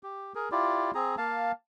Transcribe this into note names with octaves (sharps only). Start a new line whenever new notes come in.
G4
G#4 A#4
E4 F4 G4 D5
C4 G#4 A#5
A#3 F5 A5